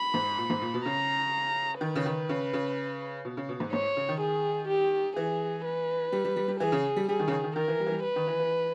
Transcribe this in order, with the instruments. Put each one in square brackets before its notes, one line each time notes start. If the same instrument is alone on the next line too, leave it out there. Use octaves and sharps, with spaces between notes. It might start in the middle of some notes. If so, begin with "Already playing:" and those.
Already playing: [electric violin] B5
[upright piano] G#2
A#2
G#2
A#2
B2
[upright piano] C#3 [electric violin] A#5
[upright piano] D#3 [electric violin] B4
[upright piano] C#3
D#3
C#3
C#3
B2
C#3
B2
G#2
[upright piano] G#2 [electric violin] C#5
[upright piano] C#3
D#3
[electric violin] G#4
G4
[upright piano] E3 [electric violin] G#4
[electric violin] B4
[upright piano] G3
G3
G3
G3
[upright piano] E3 [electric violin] G#4
[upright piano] C#3
G3
[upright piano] G3 [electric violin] G#4
[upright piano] D#3
C#3
D#3
D#3
[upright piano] D#3 [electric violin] A#4
[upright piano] E3
G3
E3
G3
[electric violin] B4
[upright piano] D#3
E3
E3